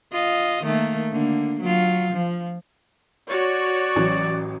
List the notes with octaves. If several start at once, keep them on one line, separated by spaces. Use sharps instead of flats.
F4 D#5
D#3 A3 A#3
D3 A#3
F#3 F4
F3
F#4 C#5 D5
A1 F#3